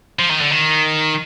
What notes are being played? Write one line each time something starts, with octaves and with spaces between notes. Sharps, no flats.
F3
D#3
D3
D#3